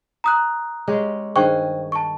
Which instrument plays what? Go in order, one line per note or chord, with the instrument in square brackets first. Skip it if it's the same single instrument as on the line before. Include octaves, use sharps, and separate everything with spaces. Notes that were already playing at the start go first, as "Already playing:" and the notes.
[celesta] A#5 D#6 F#6
[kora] G#3 C#4 G4
[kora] G2 D#3 G#4 [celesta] C5 G5 C#6
[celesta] A5 C#6